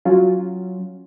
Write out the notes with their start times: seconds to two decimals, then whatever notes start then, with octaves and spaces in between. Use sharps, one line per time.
0.05 F#3 C#4 F4